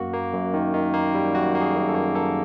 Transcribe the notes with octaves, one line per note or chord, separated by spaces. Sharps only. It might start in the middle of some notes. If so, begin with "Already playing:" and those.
Already playing: F#2 A#3 F#4
A#3
F#2
D#3
D#3
A#3
G3
F#2 F#4
A#3
G#4
F#2
A4
A#3
A#3 A4